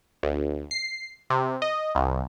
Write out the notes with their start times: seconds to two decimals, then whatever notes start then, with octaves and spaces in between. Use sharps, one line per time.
0.23 D2
0.71 C7
1.30 C3
1.62 D#5
1.95 C2